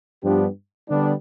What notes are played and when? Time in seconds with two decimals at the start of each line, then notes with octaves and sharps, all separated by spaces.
0.23 G2 F3 B3 D4 G4
0.89 D3 G3 B3 D4